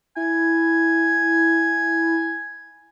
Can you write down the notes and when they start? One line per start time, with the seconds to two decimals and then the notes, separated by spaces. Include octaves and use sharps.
0.16 E4 G#5